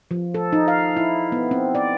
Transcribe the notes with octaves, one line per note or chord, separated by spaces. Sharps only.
F3
A4
D#4
F5
E4
B3
C4
D5